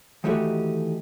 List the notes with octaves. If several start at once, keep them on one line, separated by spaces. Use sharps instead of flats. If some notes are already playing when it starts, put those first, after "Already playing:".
D#3 E3 A3 D#4 F#4 G4